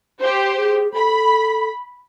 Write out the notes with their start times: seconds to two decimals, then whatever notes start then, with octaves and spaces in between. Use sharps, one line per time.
0.19 G4 C5
0.56 G#4
0.94 A4 B5